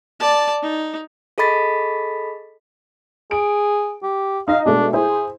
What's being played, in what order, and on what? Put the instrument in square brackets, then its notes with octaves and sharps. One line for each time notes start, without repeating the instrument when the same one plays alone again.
[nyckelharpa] D5 A5
D#4
[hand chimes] G#4 A4 D#5 B5 A6 B6
[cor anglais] G#4 [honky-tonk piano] D7
[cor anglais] G4
[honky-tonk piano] D#4 D#5 [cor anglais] F5
[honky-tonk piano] B2 G#3 A3 [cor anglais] D4
[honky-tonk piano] E4 C5 [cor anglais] G#4